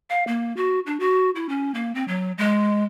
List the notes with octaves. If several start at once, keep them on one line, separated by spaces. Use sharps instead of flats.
F5
A#3
F#4
D4
F#4
E4
C#4
A#3
C4
F#3
G#3